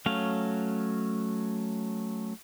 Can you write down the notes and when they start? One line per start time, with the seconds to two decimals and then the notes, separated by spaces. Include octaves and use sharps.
0.06 F#3 A3 C#4 F5